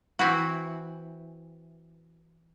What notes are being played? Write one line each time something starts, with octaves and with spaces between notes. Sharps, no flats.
E3 C4 E4 F#4